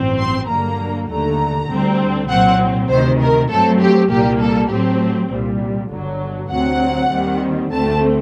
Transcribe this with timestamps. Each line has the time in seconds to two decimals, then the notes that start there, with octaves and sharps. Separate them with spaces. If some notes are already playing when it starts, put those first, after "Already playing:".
Already playing: A1 G2 F#3 C4
0.19 C6
0.48 G2 D3 F#3 A#3 A#5
1.09 D#2 D3 A3 A#5
1.70 D2 D3 G3 C4
2.29 C2 A#2 F#3 C4 F#5
2.89 D2 C3 D#3 C5
3.20 A#4
3.49 G2 F#3 A3 C4 A4
3.81 G4
4.10 C2 A#2 G3 A#3 G4
4.40 A4
4.70 A2 F#3 A3 C4 G4
5.30 C2 A#2 G3
5.90 G1 G2 D3 F#3
6.50 D2 C3 F#3 C4 F#5
7.11 D#2 D#3 G3 C4
7.71 D2 D3 A3 C4 A5